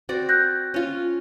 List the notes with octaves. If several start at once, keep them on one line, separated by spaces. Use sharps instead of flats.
C4 F#4 D5
F#6 G6 A#6
C#4 F4